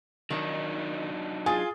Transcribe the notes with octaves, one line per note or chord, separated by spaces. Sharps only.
D#3 F#3 D4 D#4
F4 G#4